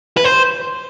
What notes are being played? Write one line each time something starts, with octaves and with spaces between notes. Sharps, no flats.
B4
C5